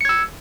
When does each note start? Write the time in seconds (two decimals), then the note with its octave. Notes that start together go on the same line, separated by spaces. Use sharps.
0.01 C#7
0.05 G#6
0.09 E6